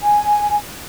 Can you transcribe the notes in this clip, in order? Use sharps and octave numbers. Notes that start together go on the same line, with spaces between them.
G#5